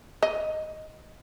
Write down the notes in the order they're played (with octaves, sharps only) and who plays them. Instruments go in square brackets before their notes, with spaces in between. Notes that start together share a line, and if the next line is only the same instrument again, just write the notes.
[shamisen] D#5